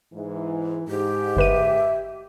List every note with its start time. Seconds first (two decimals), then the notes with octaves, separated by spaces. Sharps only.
0.13 G#2 E3
0.88 G#2 G4
1.36 G1 B4 E5 D#7